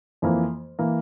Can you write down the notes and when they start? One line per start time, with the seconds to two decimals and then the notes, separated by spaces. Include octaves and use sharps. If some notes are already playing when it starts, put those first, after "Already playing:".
0.22 F2 E3 A#3
0.79 E3 A#3